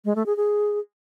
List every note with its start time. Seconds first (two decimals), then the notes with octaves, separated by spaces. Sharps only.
0.05 G#3
0.16 A3
0.26 G#4
0.37 G#4